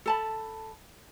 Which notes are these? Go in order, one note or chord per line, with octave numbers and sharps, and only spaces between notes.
A4 A5 B5